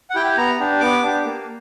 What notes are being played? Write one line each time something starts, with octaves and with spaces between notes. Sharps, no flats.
F#5
E4 G4 G5
B3 A#5
D4 G4
B3 D6
D4 G4
A#3